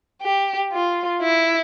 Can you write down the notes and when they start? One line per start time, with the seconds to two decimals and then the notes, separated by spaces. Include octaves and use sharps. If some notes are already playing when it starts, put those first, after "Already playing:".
0.22 G4
0.73 F4
1.22 E4